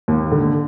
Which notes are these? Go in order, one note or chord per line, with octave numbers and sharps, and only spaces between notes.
D#2
D3